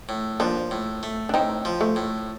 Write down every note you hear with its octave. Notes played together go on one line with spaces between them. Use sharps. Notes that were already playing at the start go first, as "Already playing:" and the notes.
A2
F3 A#3 D4
A2
A3
D4
A2 C4 D#4
F3
A3
A2